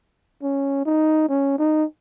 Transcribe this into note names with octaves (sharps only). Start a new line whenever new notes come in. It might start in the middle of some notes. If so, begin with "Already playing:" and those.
C#4
D#4
C#4
D#4